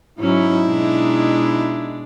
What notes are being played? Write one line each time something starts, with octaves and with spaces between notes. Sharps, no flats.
G#2 F#3 C#4 D#4 E4
B2 G#3 D4